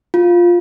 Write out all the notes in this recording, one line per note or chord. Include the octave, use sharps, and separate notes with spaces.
F4